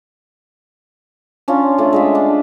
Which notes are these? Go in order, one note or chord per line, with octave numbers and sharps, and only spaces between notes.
C#4 D4 F4
A3 D4 F4
G#3 F4 E5
D4